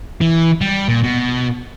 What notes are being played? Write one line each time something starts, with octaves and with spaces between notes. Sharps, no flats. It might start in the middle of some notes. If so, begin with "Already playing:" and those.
E3
G3
A#2
B2